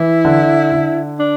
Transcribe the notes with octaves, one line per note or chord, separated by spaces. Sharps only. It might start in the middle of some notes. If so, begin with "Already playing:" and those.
Already playing: E3 E4
D3
D3
D4